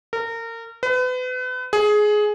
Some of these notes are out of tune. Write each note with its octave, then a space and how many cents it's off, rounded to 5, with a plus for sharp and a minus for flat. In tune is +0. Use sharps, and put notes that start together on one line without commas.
A#4 -30
B4 +35
G#4 +15